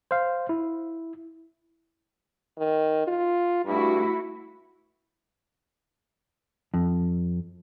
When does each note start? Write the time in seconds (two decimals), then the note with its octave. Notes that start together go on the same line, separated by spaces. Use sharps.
0.11 C5 F5
0.49 E4
2.59 D#3
3.07 F4
3.65 G2 A3 E4 F#4
6.74 F2